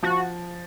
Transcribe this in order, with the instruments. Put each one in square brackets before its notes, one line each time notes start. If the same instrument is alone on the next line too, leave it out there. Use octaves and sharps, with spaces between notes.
[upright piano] F3 [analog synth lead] F#4